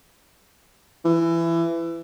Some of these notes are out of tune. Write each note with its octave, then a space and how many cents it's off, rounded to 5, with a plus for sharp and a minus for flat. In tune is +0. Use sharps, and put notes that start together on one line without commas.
E3 +20